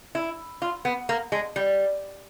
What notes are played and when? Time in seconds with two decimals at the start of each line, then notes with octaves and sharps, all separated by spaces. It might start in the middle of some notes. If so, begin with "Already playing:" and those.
0.15 E4
0.62 F4
0.85 B3
1.09 A#3
1.32 G#3
1.56 G3